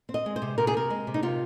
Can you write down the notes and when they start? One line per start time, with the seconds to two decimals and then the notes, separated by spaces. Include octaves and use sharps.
0.09 C4
0.14 D#5
0.26 G#3
0.36 C5
0.42 C3
0.58 C3 A#4
0.67 G#4
0.74 C4 A#4
0.90 G#3
1.07 C3
1.14 D#4
1.23 C3 F4